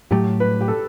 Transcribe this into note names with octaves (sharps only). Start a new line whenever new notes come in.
A2 F#3 A3 G4
B4
G4
A4